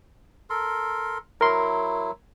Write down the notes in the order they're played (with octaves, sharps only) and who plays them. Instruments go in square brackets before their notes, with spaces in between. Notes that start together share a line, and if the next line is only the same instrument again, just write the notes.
[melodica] A4 A#4 C6
[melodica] F#3 E4 [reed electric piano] A#4 C6